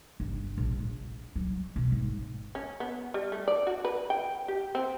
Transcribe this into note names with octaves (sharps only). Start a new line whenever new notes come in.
G1
A#1
A#1
F#3
B2
G#1
C#4
B3
G3
A3
D5
F#4
B4
G5
G4
C4